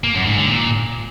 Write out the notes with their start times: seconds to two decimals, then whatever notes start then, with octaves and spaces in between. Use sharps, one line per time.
0.04 A#3
0.15 F#2
0.26 G#2
0.37 D3
0.48 A#2